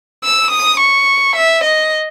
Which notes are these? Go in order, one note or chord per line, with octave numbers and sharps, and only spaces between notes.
E6
D#6
C#6
E5
D#5